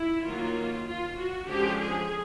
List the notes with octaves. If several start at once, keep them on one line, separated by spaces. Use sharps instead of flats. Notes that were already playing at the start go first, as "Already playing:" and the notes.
Already playing: E4
D#3 F#3 A#3 F4
F4
F#4
D3 F3 G#3 C#4 G4
G#4